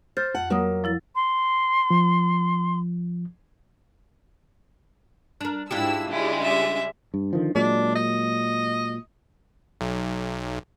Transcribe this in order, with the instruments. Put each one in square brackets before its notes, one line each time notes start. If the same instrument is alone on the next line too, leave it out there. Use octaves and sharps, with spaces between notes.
[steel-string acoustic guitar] C5 [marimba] F6 G6 A6
[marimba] F2 [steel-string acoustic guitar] F#5
[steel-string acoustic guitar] F#3 A#3 [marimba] A#4 F#5 D#6
[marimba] F3 E4 A6
[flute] C6
[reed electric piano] F3
[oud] D4 A#4
[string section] G#2 E4 E6 [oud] D4 F4 G4
[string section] C#3 G3 G#3 [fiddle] E4
[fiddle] E5
[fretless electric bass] G2
D3 D#3 F3
[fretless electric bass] A#2 F#3 G#3 [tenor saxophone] D4
[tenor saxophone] D#5
[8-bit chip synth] B1